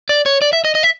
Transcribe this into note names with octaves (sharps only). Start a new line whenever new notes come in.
D5
C#5
D5
E5
D#5
D#5
E5